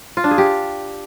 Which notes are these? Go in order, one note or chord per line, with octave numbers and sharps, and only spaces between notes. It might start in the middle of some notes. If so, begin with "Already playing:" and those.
F4
D4
G#4
G4